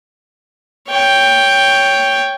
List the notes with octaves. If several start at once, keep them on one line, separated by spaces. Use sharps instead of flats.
C#5 G5